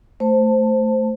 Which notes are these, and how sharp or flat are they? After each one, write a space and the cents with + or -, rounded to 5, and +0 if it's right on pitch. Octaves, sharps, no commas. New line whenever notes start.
A3 +0 C5 +0 A5 +15